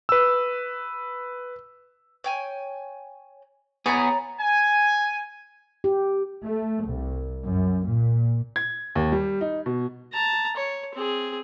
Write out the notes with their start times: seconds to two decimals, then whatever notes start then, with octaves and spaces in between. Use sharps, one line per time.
0.09 B4 E6
2.24 C#5 G5 G#5
3.86 B3 G#4 C#5 D5 A#5
4.38 G#5
5.84 G4
6.44 A3
6.85 C2
7.44 F#2
7.86 A#2
8.56 G#6
8.95 D#2
9.12 G3
9.41 D#4
9.66 B2
10.13 A5 A#5
10.56 C#5
10.95 C4 G#4